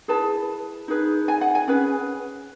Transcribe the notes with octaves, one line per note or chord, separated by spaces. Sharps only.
E4 G#4 B4 A5
D#4 G#4 B4
G#5
F#5
G#5
C#4 G#4 B4